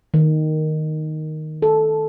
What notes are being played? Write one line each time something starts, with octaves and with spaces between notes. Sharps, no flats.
D#3
A4